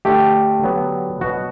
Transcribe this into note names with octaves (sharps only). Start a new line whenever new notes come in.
D3 A3 G4
D3 F#3 B3
B2 F#3 B3 F#4